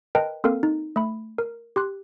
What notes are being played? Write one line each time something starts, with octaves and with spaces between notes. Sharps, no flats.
A#4 B4 D#5 G5 A5
A#3 C4 A4 A#4 F5
D#4
A3 B5
A#4
G4 C6 F#6